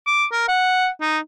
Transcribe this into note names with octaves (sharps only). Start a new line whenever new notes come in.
D6
A#4
F#5
D#4